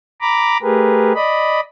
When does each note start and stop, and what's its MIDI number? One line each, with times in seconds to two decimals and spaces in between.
0.21 0.58 82
0.21 0.58 83
0.21 0.58 86
0.62 1.13 57
0.62 1.13 67
0.62 1.13 68
0.62 1.13 70
0.62 1.13 71
1.15 1.60 74
1.15 1.60 75
1.15 1.60 83